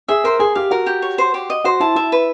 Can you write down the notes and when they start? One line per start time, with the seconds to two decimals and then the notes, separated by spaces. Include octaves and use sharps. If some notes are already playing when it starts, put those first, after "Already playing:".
0.08 G#4 E5
0.24 A#4 C5
0.40 G#4 G#5
0.55 G4 F5
0.71 F#4 A#4
0.86 G4
1.02 C#5
1.18 C5
1.34 G4
1.50 D#5
1.64 F#4 C5
1.80 E4 A5
1.96 E4 E5
2.12 B4